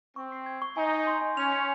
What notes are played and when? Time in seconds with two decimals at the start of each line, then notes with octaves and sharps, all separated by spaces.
0.16 C4 C#6
0.32 C7
0.46 G#6
0.62 C#6
0.77 D#4 G#5
0.92 G6
1.07 C6
1.21 G#5
1.37 C#4 F7
1.52 C#7